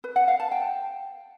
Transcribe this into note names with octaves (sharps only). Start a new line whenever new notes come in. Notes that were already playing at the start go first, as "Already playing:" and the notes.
B4
F#5
F5
A5
G5